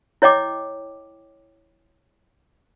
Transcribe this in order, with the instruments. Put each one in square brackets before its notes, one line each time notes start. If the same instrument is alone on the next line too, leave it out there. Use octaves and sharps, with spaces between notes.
[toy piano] E4 C#5 D#5 G5 D6